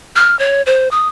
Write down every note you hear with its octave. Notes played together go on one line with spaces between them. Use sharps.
F6
C#5
C5
D#6